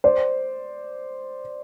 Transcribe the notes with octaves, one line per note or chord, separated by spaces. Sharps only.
C5 D5